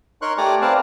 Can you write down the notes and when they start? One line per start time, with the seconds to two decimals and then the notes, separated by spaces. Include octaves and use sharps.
0.22 D#4 A#4 C#5 C6 C#6 F#6
0.38 A3 G4 D5 G#5 A#5 D6
0.61 C4 A#4 B4 D5 F5 A5